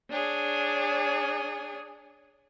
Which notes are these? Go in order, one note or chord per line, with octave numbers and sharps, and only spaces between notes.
D4 G#4 C#5